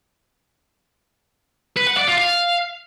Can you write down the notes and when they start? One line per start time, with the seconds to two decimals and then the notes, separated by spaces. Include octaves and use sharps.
1.77 B4
1.87 F#5
1.97 D5
2.08 F4
2.18 F5